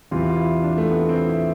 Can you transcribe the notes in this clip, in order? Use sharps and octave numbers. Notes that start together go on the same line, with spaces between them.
E2 C3 E3 F4
F4
E4
D4
A3
B3
C4
E4